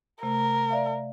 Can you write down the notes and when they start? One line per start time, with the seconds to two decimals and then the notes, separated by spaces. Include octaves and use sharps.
0.23 C3 A3 A#4
0.70 D5 E5 F5